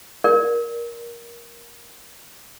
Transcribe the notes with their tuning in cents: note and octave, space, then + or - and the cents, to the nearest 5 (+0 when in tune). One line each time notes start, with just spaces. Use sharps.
A#4 +15 D5 +0